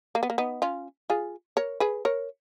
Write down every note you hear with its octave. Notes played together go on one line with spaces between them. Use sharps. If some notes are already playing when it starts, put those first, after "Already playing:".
A#3
B3
A#3
B3 D#4
C#4 F4
F4 G#4
A#4 C#5
G#4 B4
A#4 C#5